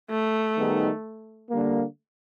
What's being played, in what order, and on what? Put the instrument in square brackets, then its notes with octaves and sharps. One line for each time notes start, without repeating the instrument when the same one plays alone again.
[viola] A3
[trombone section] D#3 G3 B3 D#4 G#4
D3 G3 A#3